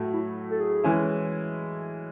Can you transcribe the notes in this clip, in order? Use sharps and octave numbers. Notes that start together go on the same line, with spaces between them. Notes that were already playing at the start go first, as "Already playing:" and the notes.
Already playing: A2 F#3 A3
E4
A4
G#4
E3 G#3 C#4 E4